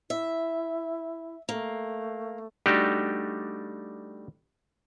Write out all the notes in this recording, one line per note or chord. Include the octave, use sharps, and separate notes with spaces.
E4 E5
A3 A#3
G3 A3 D4 D#4 F#4 G4